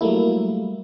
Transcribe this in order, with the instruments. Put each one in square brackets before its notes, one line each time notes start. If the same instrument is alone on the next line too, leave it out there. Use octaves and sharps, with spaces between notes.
[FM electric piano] F#3 G3 A3 A#3 E4